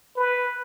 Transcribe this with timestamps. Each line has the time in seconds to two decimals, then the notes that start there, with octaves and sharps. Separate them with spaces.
0.17 B4